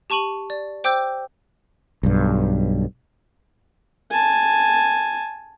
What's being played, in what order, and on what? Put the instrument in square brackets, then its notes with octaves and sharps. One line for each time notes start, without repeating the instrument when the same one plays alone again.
[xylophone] G4 A5 C#6 D#7 F#7
D5
C5 G5 D6 E6 G6
[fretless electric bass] B1 G2
[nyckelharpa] G#5 A5